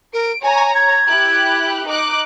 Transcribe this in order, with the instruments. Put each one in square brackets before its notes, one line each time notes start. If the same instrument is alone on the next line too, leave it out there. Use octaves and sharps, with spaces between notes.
[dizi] A#4 [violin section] D7
[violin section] C#5 A#5 [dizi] G#5
[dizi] G#6
[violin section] E4 G4 F#6
D#4 D6 F#6